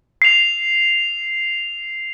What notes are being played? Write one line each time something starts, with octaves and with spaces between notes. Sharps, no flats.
C7 F7